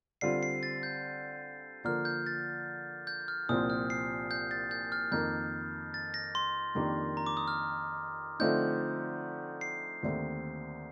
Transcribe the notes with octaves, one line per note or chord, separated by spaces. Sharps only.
D3 G3 C4 F4 C7
C7
A6
G6
D3 F3 A#3 F6
G6
A6
G6
F6
C2 A#2 F3 C4 D#6
F6
C7
G6
A6
G6
F6
F2 D#3 A#3 G6
A6
A#6
C6
F2 D#3 A#3 D4 G4
A#5
D6
D#6
F6
D3 F3 A3 C4 D#4 G6
C7
D#2 D3 A3 C4